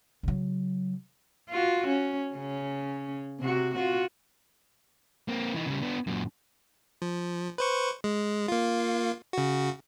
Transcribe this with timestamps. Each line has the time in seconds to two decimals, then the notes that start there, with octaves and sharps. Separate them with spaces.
0.23 C#3 F#3
1.50 F4 F#4
1.88 C#4
2.34 C#3 C#4
3.40 C3 F#4
3.75 F4 F#4
5.28 A#3 C4
5.54 E3 D#4
5.66 C#3 G3
5.81 B3 D4
6.07 F#2 A#2
7.02 F3
7.58 B4 C5 C#6
8.04 G#3
8.48 A#3 F4
9.33 C#3 F#4